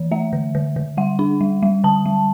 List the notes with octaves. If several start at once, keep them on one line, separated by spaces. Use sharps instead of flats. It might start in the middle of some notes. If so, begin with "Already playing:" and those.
Already playing: E3
A3 E5
D3
D3
D3
G3 F#5
D4
G3
G3
D3 A5
G3